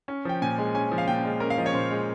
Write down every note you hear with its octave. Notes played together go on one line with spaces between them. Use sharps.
C#4
F3 G5
A#2 G#5
G#3
C#4 G#5
F3
F5
A#2 G5
G#3
C#4 A#4
F5
F3 D#5
C#5
A#2 C5
G#3